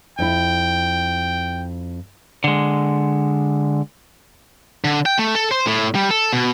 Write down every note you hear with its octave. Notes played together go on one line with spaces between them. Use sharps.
F2 E4 G5
D3 G#3
D3
G5
A3
A4
C5
A2
G3
A4
B2